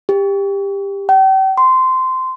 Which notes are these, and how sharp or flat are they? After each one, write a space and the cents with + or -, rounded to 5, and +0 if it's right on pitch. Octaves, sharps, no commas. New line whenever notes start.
G4 +20
G5 -40
C6 -15